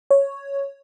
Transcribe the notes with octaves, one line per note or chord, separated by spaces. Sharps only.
C#5